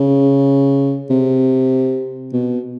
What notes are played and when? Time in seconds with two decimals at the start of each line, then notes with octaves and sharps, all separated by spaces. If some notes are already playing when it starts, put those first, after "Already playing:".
Already playing: C#3
1.10 C3
2.33 B2